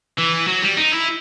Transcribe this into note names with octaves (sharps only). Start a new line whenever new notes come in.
E3
F#3
G3
D#4
E4